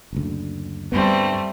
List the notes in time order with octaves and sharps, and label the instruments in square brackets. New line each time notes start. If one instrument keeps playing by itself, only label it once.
[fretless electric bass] F#1 D2
[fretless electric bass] D2 G2 B3 [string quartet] G3 A3 C4